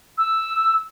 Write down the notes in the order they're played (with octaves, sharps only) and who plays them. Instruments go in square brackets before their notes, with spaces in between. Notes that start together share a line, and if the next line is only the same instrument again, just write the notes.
[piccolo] E6